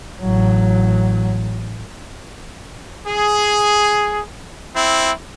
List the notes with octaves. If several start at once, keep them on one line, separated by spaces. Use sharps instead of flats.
A1 F#3
G#4
C4 E4